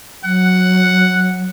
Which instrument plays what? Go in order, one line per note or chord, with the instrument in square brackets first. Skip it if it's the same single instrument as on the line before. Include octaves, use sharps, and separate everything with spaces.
[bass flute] F#3 [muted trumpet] F#5